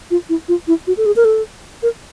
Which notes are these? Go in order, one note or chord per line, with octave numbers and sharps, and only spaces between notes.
F4
E4
F4
E4
F#4
A4
G#4
A#4
A4
A#4